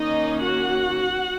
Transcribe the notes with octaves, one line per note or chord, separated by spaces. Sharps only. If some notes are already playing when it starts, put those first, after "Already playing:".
Already playing: D#3 A#3 C#4 D#4 D#5
F#4 F#5